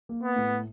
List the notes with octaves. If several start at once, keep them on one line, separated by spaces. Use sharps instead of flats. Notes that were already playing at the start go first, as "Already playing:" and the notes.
A#3
B3
A2